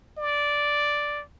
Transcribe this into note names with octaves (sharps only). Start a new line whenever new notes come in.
D5